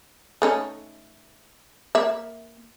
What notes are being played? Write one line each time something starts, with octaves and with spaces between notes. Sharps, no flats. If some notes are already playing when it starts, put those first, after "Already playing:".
A3 C#4 D#4
A#3 E5